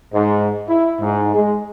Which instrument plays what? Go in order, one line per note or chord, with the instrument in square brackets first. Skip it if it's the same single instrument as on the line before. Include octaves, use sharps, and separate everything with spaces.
[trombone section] G#2
E4
G#2
G#3